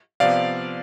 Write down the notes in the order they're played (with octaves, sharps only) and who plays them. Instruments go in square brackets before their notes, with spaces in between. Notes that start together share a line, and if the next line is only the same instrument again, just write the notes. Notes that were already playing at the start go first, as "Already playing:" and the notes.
[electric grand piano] C3 F3 B3 D5 F5